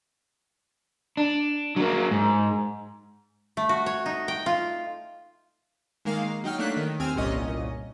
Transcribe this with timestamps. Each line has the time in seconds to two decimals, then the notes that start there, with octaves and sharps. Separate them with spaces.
1.17 D4
1.76 F#3 A#3
2.11 G#2
3.57 A3
3.69 F#4
3.86 C#5
4.06 D#4
4.28 G5
4.46 F4
6.05 D#3 G#3 A#3 F5
6.44 F#3 D#4 G5 F6
6.58 F#3 A3 A#3 D4 F#6 B6
6.77 D#3
6.99 D#2 C4 G#5 F6
7.15 G1 C2 A#2 C#4 D#5